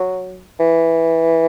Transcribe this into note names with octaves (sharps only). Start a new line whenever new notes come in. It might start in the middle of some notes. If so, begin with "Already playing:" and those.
Already playing: F#3
E3